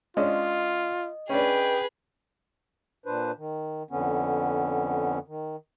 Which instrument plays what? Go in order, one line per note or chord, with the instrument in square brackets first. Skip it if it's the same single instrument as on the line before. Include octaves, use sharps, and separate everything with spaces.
[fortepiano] G#3 C#4 D4 [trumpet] F4 [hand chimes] D#5
[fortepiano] C#4 D4 [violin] G#4 B4 [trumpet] G5
[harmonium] A#2 D4 B4 C5
D#3
F2 D3 B3 C#4
D#3